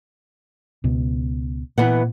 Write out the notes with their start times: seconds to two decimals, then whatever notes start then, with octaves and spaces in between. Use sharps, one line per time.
0.84 C#2 B2
1.78 A#2 E3 B3 F#5